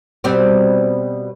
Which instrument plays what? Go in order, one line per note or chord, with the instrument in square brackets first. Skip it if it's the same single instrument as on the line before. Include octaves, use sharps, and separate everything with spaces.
[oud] B2 G3 C4